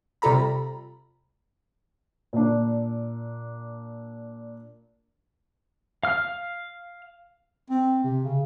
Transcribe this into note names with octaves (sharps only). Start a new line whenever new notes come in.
C3 G3 F4 A4 A#5 B5
A#2 D4
F5 F6
C4
C3
C#3